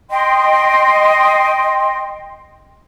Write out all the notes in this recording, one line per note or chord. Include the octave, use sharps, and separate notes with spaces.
D#5 G5 C6